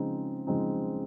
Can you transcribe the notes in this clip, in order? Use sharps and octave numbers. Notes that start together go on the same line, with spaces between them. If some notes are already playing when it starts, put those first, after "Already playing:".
Already playing: C#3 F3 G#3 C4 D#4
C#3 F3 G#3 C4 D#4